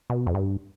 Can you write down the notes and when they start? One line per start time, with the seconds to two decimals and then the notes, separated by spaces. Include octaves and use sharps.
0.10 B2
0.27 F2
0.35 G2